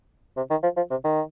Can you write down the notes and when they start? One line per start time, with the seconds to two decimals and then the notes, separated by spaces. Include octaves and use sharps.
0.37 C3
0.50 D#3
0.63 F3
0.76 F3
0.90 C3
1.05 D#3